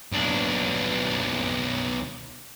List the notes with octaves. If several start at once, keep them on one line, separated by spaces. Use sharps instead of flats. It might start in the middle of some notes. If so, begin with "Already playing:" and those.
B1 D4